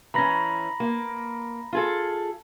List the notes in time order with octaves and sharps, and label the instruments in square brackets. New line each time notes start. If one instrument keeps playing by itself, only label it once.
[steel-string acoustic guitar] E3 C#4 [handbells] A#5 B5 A#6
[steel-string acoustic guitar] A#3
F4 G#4 A4